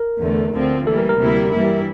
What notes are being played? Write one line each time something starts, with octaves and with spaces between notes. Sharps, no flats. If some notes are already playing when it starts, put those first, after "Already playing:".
Already playing: A#4
E2 D3 A3
D2 D3 F3 C4
E3 G3 A#3 A4
A#4
A#4
D2 C3 G3 A#3 E4
G2 E3 G3 A#3 E4